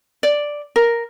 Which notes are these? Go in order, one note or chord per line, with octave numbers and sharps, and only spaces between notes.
D5
A#4